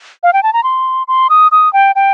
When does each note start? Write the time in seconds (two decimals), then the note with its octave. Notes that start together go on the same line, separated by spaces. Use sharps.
0.23 F5
0.33 G5
0.43 A5
0.53 A#5
0.63 C6
1.08 C6
1.30 D#6
1.52 D#6
1.73 G5
1.95 G5